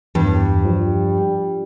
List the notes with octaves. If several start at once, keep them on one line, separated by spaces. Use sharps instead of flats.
E2 G2
F3 G3